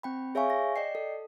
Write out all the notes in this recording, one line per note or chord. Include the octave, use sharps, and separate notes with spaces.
C4 G5 B5
G#4 C#5 E5 F5 G#5 C#6
A#6
D5 D#5 G5 C7
A4